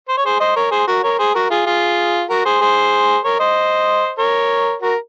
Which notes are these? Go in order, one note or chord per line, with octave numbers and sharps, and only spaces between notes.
C5
C#5
G#4 C5
C5 D#5
A#4 C#5
G#4 C5
F#4 A#4
A#4 C#5
G#4 C5
F#4 A#4
F4 G#4
F4 G#4
F#4 A#4
G#4 C5
G#4 C5
A#4 C#5
C5 D#5
A#4 C#5
F#4 A#4